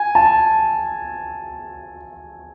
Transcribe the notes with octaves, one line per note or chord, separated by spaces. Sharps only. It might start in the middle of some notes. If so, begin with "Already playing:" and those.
Already playing: G#5
A5